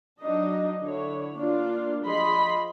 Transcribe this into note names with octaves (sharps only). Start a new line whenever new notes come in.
F#3 D4 D#4 D#5
D3 E4 C#5
A#3 D4 F4
F3 G#4 D#5 B5 C6